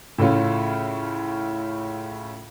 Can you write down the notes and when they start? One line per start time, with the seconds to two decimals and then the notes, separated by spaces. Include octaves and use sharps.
0.18 A2 C#3 A3 C#4 F4